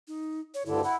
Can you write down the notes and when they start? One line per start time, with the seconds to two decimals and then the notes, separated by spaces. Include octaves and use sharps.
0.08 D#4
0.54 C#5
0.66 D2 G2 D3 E4
0.84 E4 F#5